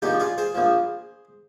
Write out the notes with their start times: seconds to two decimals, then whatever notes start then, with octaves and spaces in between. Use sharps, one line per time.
0.02 A#1 A#2 F3 D#4 G4
0.20 F4 G#4
0.38 G#4 C5
0.55 A#1 A#2 F3